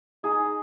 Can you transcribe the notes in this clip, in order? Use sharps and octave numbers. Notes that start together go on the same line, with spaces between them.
D#4 G#4
D#4